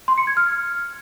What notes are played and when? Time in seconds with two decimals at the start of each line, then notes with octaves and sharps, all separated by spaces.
0.08 C6
0.18 C#7
0.27 G#6
0.37 F6